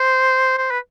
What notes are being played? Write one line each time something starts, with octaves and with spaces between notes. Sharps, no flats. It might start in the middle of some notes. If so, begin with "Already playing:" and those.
Already playing: C5
C5
B4